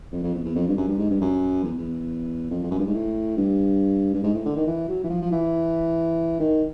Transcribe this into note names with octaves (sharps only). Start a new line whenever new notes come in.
F2
F2
E2
E2
F2
G2
F#2
G2
G#2
G2
F#2
E2
E2
F2
F2
F#2
G2
G#2
A2
G2
G2
G#2
A2
D3
D#3
E3
F#3
E3
F3
F3
E3
D#3